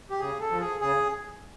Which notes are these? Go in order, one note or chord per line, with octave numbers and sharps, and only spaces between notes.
G4
C#3 G#4
A4
F3
G#4
C#3 G#4